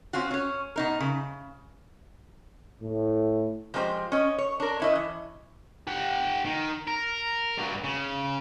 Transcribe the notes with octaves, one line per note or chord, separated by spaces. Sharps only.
C4 C#4 F4 F#4
C#4 C#5
B2 D#4 A#4
C#3
A2
F3 G#3 C4 D4 G4 C5
C#4 D#5
C#5
D4 A#4
C#4 E4 D#5
E3
G4 F#5
D#3
A#4
G2 F#3
C#3